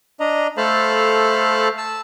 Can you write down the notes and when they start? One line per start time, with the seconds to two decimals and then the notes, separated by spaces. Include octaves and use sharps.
0.20 D4 D#5 A#5
0.57 A3 A4 C5 F5 A5 B5
1.78 A5 E6